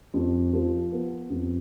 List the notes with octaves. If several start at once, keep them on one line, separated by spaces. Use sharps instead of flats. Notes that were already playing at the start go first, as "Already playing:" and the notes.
F2
F3
B3
F2